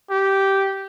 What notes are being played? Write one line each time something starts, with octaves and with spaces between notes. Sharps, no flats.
G4